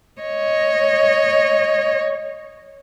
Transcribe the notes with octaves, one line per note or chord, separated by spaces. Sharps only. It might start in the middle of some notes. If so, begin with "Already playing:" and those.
C#5 D#5